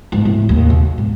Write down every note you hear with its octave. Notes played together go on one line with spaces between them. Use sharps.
G#2
A2
D#2
B1
G#2